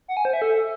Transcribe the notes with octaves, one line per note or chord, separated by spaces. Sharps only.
F#5
G#5
C5
E5
A4